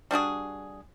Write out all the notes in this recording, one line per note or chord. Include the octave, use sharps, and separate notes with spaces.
G3 D4 F#4 G#4